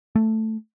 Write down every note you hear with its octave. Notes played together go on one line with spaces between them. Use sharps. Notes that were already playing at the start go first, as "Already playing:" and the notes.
A3